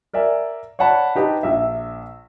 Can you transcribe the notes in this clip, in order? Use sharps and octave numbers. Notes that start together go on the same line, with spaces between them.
A#4 D5 E5 G#5
C#5 D5 F#5 A5 B5
D#4 G4 B4 A5
A#1 E5